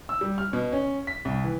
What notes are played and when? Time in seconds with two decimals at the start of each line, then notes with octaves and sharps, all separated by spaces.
0.09 E6
0.21 G3
0.38 F6
0.53 B2
0.72 C#4
1.07 B6
1.25 C2
1.44 E3